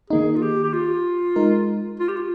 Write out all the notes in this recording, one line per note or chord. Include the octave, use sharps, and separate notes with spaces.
D#3 A#3 D#4 G#4
F4
G4
G4
F4
G#3 D#4 A#4
F4
G4
F4